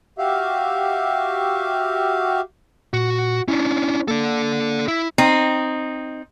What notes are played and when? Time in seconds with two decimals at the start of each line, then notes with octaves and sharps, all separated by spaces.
0.18 F#4 G4 E5 F5
2.94 A#2 F#4
3.48 C#4 D4 E4
4.08 A#3 A4 D5
4.88 E4
5.18 C4 D#4